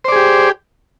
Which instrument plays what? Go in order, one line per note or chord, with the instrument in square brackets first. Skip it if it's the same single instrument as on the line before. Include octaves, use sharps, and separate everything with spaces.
[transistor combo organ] C5
D5
G#4
G4